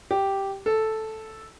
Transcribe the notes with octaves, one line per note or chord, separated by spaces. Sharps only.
G4
A4